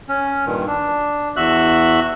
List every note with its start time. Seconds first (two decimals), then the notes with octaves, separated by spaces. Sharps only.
0.09 C#4
0.46 G2 A#2 D#3
0.67 D4
1.36 E2 F#4 E5 F#6